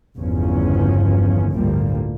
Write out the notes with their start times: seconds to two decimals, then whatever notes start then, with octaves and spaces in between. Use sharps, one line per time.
0.17 G1 E2 C#3 F3 C#4
1.54 G1 D2 A2 F3 G3 A#3